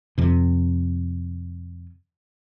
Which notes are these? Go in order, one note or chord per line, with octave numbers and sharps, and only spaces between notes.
F2 C3